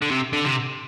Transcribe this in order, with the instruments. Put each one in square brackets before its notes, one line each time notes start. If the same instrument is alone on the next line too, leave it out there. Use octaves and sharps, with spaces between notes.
[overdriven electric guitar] D3
C3
D3
C3